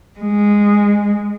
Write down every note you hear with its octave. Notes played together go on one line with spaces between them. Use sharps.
G#3